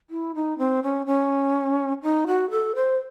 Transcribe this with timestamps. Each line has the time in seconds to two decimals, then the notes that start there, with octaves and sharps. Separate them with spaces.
0.10 E4
0.35 D#4
0.58 C4
0.83 C#4
1.06 C#4
2.03 D#4
2.27 F#4
2.50 A4
2.75 C5